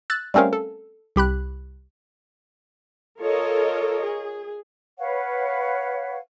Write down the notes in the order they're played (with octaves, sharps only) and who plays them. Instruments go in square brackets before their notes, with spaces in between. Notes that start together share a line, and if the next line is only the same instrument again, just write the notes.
[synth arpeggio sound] E6 F#6 A6
G3 A3 C4 C#4 A#4 F5
A4
C2 G4 B5 F#6
[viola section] F4 A4 A#4 C#5 D#5
G#4
[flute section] B4 C#5 F5 F#5